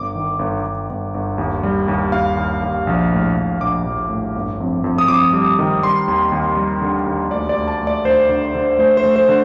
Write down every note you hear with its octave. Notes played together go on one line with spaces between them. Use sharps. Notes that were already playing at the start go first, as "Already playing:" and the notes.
Already playing: G1 D6
D#3
G1
G1
G1
G1
D#2
G3
D#2
D#2 F5
D#2
D#2
A#1
A2
A#1
A#1 D6
A#1
A2
G1
F2
F2
D#6
F2 D6
G3
D#3
G3 C6
D#2
D#2
G3
D3
D#2
D2 D5
D5
D2
A5
A3
D5
D2 C5
D3
D3
A3 C5
C5
A3
C5
D3